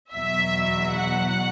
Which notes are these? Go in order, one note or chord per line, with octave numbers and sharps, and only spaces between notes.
E2 B2 F#3 E5
F#5